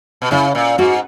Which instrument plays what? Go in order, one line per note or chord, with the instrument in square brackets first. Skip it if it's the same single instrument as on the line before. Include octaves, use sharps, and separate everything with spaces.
[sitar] B2
[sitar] C#3 [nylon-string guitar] E4
[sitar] A#2
[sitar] G#2 [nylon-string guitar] F#4